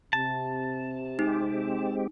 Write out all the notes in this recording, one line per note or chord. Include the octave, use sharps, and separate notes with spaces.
C3 A5
G#3 C4 D#4 G4